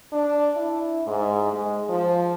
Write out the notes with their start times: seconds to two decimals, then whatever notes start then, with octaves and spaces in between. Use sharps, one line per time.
0.12 D4
0.56 E4
1.07 G#2
1.53 G#3
1.89 F3